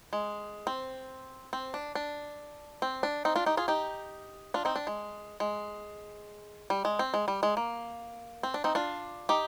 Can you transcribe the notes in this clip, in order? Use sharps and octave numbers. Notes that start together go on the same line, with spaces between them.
G#3
C4
C4
D4
D4
C4
D4
C4 D#4
D4 F4
D#4 G4
F4 G#4
D#4 G4
D4 F4
C4 D#4
D4
G#3
G#3
G3
G#3
C4
G#3
G3
G#3
A#3
C4
D4
C4 D#4
D4 F4
D#4 G4